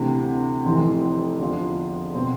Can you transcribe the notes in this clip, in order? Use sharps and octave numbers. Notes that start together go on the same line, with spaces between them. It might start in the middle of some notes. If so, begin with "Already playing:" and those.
Already playing: D2 C3 E3
F1 F2 E3 C4
E2 D3 F3
B2 C4